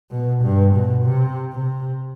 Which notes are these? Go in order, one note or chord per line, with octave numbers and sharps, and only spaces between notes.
B2
G2
B2
C3
C3